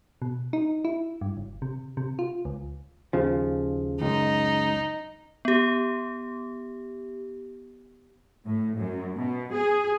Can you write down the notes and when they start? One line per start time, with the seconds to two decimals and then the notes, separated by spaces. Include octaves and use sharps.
0.22 B2
0.53 D#4
0.85 E4
1.21 G2
1.37 F#1
1.62 C3
1.97 C3
2.19 F4
2.45 C#2
3.13 D#2 C#3 F3
4.01 C#2 F#2 D#4
5.45 B3 G4
8.46 A2
8.78 F#2
9.15 B2
9.53 G#4